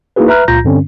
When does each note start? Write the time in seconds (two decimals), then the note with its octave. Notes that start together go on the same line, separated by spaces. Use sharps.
0.16 A#3 D#4 E4 F#4 G#4 B4
0.28 B4 E5 A#5 F6 F#6
0.48 C#2 A#2 F4 A#5 G6 A#6
0.64 G2 D3 C4 C#4